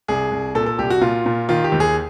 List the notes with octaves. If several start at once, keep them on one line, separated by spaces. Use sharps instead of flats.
C2 G#4
C2
A#2 A4
A4
C2 G4
F#4
A#2 F4
A#2
D#3 F4
G4
D#2
G#4